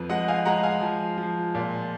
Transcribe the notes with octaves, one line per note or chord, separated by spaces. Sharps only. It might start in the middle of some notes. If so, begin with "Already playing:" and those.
Already playing: F2 F3 B4
G#3 D#5 F#5
F5 G#5
G#3 F#5 A#5
F5 G#5
F3
F3
A#2